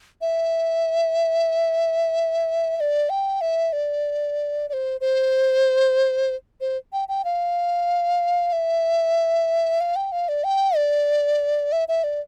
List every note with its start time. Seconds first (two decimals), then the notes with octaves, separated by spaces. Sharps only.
0.21 E5
2.77 E5
2.80 D5
3.10 G5
3.41 E5
3.73 D5
4.69 D5
4.73 C5
5.01 C5
6.61 C5
6.93 G5
7.09 G5
7.25 F5
8.53 E5
9.81 F5
9.96 G5
10.12 F5
10.29 D5
10.44 G5
10.76 D5
11.72 E5
11.88 E5
12.04 D5